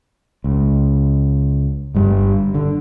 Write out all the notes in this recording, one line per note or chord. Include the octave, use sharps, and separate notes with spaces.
C#2
G1 G2 G3
D3